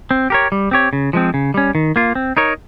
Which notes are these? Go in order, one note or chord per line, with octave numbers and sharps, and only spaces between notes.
C4
G4 A#4 C#5
G3
C4 G4 C#5
C#3
F3 G#3 C4
C#3
G3 C#4
D#3
A#3 F4
C4
D#4 A#4 C#5